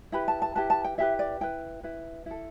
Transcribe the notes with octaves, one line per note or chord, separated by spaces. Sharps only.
E4 G4 B4 B5
A5
A5
E4 G4 B4 A5
A5
G5
E4 G4 B4 E5
D5
E4 B4 G5
E4 B4
E4 A4